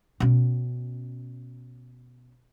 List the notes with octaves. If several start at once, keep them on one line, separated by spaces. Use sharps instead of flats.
B2 C#4